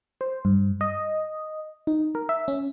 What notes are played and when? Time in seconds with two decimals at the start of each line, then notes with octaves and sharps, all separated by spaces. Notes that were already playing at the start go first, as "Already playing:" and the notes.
0.21 C5
0.45 G2
0.81 D#5
1.87 D#4
2.15 A#4
2.29 E5
2.48 C#4